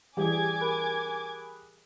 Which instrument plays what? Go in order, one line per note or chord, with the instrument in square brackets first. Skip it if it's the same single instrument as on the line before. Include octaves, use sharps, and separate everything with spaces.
[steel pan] E3 G3 [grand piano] G4 G#4 [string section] G#5 D6 G#6
[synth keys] A#4 B5 F#6